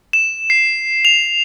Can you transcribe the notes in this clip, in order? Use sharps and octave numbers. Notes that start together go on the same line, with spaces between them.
E7
C7
F7